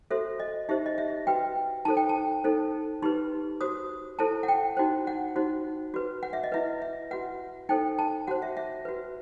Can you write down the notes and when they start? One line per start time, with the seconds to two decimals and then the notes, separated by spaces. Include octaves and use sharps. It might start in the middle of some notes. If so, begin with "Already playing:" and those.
0.11 F#4 A4 C5 E5
0.40 D#5
0.69 D#4 G4 C5 E5
0.86 D#5
0.98 E5
1.27 F#4 B4 G5
1.85 D#4 A4 C5 A5
1.97 G5
2.09 A5
2.44 D#4 A4 C5
3.02 D#4 G4 B4 C6
3.61 F#4 C5 D#6
4.19 E4 A4 C5 A5
4.43 F#5
4.48 G5
4.77 D#4 F#4 C5
5.07 F#5
5.36 D#4 F#4 C5
5.94 F#4 B4
6.23 F#5
6.33 E5
6.43 D#5
6.52 E4 B4 E5
6.82 E5
7.11 F#4 B4 F#5
7.69 D#4 A4 C5 G5
7.99 A5
8.27 F#4 C5 F#5
8.42 E5
8.57 E5
8.85 F#4 B4